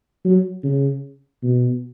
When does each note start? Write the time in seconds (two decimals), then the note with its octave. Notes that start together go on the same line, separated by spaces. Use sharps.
0.25 F#3
0.64 C#3
1.43 B2